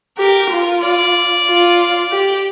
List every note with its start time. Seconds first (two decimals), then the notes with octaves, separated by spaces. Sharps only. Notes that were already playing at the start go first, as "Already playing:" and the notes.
0.18 G4 A#4
0.50 F4
0.83 D5
1.47 F4
2.12 G4